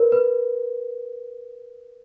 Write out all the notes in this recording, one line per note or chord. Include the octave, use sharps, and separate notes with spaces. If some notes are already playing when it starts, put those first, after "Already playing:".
Already playing: A#4 B4
B4